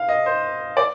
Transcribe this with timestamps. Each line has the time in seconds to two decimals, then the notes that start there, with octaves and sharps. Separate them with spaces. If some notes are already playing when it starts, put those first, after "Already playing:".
Already playing: F5
0.09 D#5
0.26 C5
0.77 D5